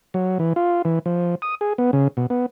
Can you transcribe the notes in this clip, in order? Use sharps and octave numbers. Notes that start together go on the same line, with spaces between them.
F#3
E3
F4
E3
F3
D#6
G#4
B3
C#3
B2
B3